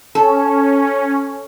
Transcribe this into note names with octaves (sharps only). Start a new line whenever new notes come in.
C#4 A4